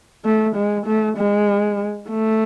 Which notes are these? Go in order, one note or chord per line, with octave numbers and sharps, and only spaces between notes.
A3
G#3
A3
G#3
A3